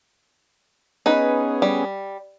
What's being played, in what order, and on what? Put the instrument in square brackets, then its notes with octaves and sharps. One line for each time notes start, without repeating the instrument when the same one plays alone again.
[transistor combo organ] B3 C#4 G#4 [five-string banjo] D#4 B4
[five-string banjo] G3